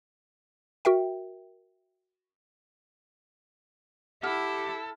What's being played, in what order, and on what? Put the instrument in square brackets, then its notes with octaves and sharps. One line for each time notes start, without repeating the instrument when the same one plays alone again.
[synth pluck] F#4 A#4 E5 G5
[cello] E4 [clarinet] G4 [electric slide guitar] A4 [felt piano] F#5 E6 F6